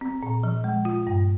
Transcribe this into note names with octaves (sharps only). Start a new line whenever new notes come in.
C4
A#2
F3
G#3
F4
G2